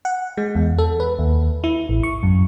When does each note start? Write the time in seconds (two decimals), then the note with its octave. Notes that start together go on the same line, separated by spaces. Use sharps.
0.05 F#5
0.37 G#3
0.55 E2
0.78 A4
1.00 B4
1.19 D#2
1.64 E4
1.89 A1
2.03 C#6
2.23 F#2